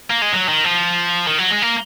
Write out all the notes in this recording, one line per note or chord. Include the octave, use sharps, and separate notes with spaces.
A#3
G#3
F#3
D#3
F3
D#3
F#3
G#3
A#3